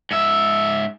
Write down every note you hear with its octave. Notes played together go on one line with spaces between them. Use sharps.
G#2 E5